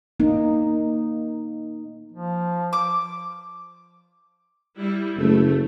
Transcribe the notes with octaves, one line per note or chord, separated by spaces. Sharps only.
A#3 D#4
F3
D6
G3 E4
F#1 A3